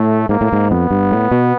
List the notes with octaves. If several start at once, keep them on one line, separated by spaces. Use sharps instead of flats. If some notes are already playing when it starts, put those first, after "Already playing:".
Already playing: A2 A3
G#2 A#3
A2
G#2
F2 B3
G2
A2
B2